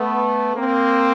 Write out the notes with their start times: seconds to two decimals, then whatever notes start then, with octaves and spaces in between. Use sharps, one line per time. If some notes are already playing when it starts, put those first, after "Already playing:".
Already playing: A3 B3
0.56 A#3 C4